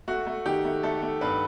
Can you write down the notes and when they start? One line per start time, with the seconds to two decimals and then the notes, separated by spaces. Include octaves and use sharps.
0.08 A3 F#4
0.27 A3
0.45 D#3 G4
0.65 A3
0.83 A3 A4
1.02 A3
1.21 G2 B4